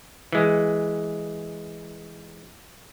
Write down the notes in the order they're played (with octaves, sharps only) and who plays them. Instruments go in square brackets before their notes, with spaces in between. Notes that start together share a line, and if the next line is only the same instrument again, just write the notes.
[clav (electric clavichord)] E3 G#3